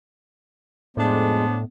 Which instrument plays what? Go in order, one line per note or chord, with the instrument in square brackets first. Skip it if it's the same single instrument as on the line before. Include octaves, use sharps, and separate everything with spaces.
[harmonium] F2 G#3 [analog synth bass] A2 [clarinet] B3 [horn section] D4 C5